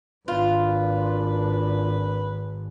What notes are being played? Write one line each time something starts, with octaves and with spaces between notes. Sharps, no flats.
G#1 D4 F4 A#4 B4